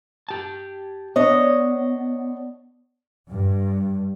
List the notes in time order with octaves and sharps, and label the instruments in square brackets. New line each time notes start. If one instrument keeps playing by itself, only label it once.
[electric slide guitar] G4 A5
[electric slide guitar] B3 [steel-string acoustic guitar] D4 C#5 D#5
[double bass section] G2